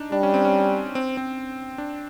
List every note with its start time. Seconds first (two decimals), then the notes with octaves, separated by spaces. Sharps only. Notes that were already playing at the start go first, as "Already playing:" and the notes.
Already playing: D4 D#4
0.12 G3 D4
0.23 C#4
0.34 C4
0.45 C#4
0.95 C4
1.17 C4
1.78 D4